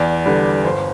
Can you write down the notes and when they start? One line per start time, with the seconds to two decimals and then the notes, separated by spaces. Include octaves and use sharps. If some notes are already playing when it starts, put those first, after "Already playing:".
Already playing: E2 D5
0.26 D3 G3 B4
0.64 G1 C5